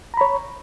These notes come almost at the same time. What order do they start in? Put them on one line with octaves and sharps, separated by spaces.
A#5 B5 C#5